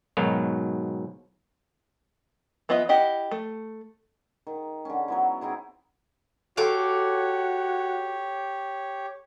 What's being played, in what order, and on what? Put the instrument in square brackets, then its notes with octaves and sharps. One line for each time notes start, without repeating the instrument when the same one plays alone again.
[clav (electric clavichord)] G#2 B2 D#3 F#3 F5
[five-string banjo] E3 B3 F4 D#5 E5
E4 G4 D#5 F#5
A3
[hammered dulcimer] D#3
D3 C#4
F#3 B3 E4
C4 D#4 E4 G#4
[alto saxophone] F#4 [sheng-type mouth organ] G4 C#5 [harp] A4 A5 C6 [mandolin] F5 D6